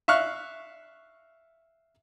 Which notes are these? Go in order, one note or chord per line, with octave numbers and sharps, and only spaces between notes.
E5 F5 C#6 F6 F#6